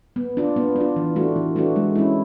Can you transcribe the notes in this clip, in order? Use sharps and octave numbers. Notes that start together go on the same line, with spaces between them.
B3
D4 F4
B3
D4 F4
E3
A3 D4 F#4
E3
A3 D4 F#4
G#3
C#4 E4